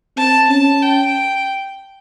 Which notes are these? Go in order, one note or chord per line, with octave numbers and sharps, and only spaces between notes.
C4 A5
C#4 A5
G5